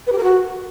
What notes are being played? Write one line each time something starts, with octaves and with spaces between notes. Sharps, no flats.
B4
G4
A#4
F#4